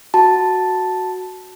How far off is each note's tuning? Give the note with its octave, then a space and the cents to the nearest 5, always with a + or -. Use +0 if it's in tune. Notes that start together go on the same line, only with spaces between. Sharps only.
F#4 +0 A5 +0